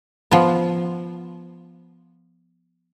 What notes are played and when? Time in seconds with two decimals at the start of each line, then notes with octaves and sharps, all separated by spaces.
0.31 F3 B3